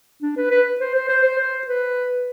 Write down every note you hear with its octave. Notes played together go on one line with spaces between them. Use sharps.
D4
B4
B4
C5
C5
C5
C5
C5
B4